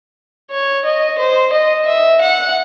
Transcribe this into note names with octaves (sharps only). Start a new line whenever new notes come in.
C#5
D#5
C5
D#5
E5
F#5